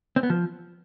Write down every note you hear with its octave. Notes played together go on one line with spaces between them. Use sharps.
C4
B3
F3